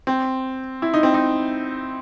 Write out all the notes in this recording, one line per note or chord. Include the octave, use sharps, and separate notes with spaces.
C4
E4
D#4
C4
D#4